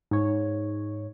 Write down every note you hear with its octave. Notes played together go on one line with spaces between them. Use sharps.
G#2 C#5